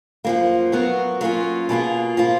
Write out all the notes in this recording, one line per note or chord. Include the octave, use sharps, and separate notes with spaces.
F#2 F3 A#3
F#3 B3 F#4 A#4
F#3 A#3 C#4 F4
B2 A#3 F4 G#4
F3 A#3 F4